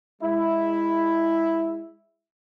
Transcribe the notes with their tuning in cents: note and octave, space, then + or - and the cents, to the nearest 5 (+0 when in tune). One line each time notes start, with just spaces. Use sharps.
G#3 -20 E4 +0